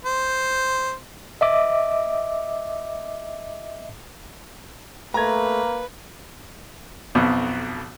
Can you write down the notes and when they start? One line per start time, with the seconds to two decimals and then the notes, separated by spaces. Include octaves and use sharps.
0.05 C5
1.41 D#5 E5 D6
5.14 A3 A#3 B4 A#5 G#6
7.15 B1 F2 B2